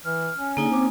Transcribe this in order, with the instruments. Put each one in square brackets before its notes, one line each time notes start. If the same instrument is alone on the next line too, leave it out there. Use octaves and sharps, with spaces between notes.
[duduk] E3 [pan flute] F6
[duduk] C#4
[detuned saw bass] D3 [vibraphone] A#3 D#4 G#5 [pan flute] G#4
[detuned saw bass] C4 [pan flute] D6